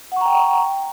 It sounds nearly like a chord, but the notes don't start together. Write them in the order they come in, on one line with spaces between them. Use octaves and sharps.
F#5 C#6 A#5 G5